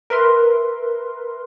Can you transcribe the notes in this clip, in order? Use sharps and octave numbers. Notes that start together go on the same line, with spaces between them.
A#4 B4 E5 C6